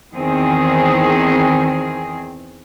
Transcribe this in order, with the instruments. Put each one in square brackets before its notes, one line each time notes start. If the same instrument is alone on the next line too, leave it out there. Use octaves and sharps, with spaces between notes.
[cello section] E2 D#3 C4 G#4